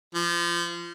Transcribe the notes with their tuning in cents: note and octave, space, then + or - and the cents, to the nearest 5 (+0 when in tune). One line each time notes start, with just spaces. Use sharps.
F3 -25